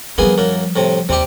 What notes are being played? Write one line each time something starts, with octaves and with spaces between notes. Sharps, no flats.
F3 G3 A#3 B3 G#4
F#2 A#3
A2 C3
D#2 C3 G3 G4